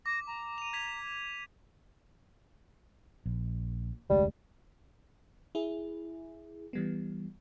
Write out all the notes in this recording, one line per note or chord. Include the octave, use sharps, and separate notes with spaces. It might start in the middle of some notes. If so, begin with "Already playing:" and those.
D6 A#6
A#5
D#7 F7
G#6 B6 F7
A#1
F1 D2 G3 G#3
E4 G#4
E3 G3 B3